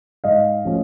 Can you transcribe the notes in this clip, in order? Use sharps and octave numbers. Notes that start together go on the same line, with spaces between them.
G#2 D#5 F5
F3 A3 C#4